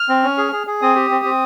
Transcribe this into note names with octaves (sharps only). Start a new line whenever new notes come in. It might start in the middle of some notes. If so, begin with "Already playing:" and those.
Already playing: F6
C4
C#4
G#4
G#4
G#4
C4 D#6
G4
C4
C4